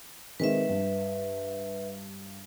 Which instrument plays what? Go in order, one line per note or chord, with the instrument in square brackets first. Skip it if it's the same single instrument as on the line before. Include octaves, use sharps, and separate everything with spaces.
[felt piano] D#3 G#3 C4 [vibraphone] B4 E5
[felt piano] G2